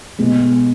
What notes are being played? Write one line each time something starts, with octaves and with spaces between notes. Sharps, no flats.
B1 B2 G#3